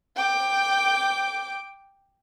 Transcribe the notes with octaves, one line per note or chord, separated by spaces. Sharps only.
G5 D6